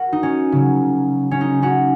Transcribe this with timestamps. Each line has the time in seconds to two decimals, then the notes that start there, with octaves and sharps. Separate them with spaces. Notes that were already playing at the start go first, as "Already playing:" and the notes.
Already playing: F#4 A#4
0.13 D#4
0.23 C#4
0.52 C#3 F#3
1.31 C#4
1.41 D#4
1.62 C#4 F#4